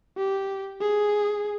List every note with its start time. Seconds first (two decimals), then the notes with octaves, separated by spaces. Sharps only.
0.17 G4
0.81 G#4